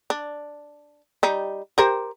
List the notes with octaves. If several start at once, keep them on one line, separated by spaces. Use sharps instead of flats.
D4
G3 D#4
G4 A#4 C5